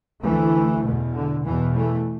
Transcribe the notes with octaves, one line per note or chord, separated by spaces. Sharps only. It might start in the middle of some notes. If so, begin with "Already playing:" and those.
D2 E3 A3
E2 B2
D3
E2 B2 E3
E3 A3